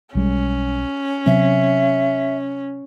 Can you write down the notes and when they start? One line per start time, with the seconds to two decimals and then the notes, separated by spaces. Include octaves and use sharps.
0.15 B1 G3 G#3 C#4
1.26 C3 F#3 C4 E5